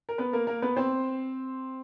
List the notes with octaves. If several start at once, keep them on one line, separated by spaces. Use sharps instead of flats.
A#4
B3 B4
A#3 A#4
A#3 A#4
B3 B4
C4 C5